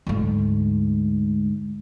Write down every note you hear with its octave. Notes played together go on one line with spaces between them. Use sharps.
D2 G#2